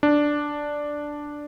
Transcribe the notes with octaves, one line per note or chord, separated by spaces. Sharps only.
D4